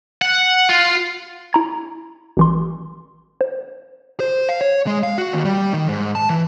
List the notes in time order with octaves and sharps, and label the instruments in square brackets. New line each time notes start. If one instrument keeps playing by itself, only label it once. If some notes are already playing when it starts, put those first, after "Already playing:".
[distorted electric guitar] F#5
F4
[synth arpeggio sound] E4 A#5 G#6
A1 E3 C6
C5
[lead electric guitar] C5
F5
C#5
G#3
F5
F#4
D#2
G3
D#3
G#2
A5
E3